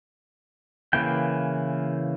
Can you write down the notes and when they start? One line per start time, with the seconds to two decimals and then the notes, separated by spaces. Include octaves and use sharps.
0.93 C#3 E3 A#3 E4 G5